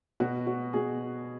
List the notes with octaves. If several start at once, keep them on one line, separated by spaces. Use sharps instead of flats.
B2 F#4
F#4
B2 G#4